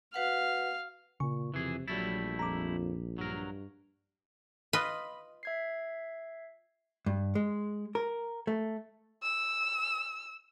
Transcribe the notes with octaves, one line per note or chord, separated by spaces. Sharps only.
F#4 B4 F5 F#5
A#2 C#3 C#6
F2 C3 E3 G#4
A#1 F#3 G3 A3 E4 A6
F2 A#5 D6
G2 F#3 A#4
F4 B4 D#5 B5
E5 G#6 C7
G2
G#3
A#4
A3
E6